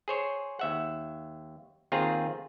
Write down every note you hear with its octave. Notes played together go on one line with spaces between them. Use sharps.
G#4 C5 C#5
D#2 E5 F#5
D#2 D#3 C4 F4 G#4 A#5